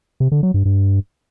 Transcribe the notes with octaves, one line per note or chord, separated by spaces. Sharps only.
C3
D3
F#3
G2
G2